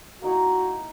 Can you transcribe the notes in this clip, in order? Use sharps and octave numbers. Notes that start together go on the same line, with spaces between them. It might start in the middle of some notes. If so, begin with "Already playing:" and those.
A#3 D#4 E4 F#4